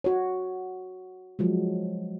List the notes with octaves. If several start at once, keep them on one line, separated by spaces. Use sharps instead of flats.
F#4 C#5
F3 F#3 G#3